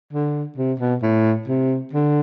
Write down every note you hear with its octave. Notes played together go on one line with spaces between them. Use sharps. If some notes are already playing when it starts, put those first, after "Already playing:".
D3
C3
B2
A2
C3
D3